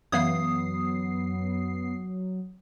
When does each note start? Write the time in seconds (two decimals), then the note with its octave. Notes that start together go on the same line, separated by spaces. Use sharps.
0.12 F#2 E3 F#3 B3 F5 D#6 G#6 C7